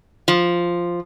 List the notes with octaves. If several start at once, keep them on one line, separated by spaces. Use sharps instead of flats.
F3